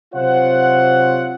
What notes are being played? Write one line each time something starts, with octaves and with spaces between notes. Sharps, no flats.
C3 F#3 F4 C5 F#5